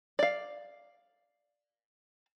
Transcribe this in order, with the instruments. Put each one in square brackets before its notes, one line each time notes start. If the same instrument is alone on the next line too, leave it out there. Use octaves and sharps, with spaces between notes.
[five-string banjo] D5 F5